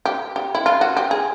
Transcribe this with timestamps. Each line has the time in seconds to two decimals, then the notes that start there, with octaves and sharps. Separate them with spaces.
0.06 G4
0.36 G4
0.55 E4
0.66 F4
0.81 F#4
0.97 G4
1.11 G#4